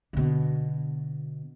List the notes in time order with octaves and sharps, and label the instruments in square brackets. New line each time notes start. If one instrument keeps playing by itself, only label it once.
[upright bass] B2 D3